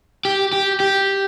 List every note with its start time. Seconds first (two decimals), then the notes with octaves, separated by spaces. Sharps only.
0.25 G4
0.53 G4
0.80 G4